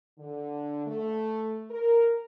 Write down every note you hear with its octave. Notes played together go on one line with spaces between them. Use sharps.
D3
A3
A#4